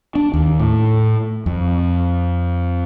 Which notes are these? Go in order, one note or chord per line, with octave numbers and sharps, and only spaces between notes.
D4
D#2
A2
F2